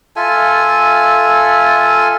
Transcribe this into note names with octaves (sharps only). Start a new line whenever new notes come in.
F4 A4 E5 G#5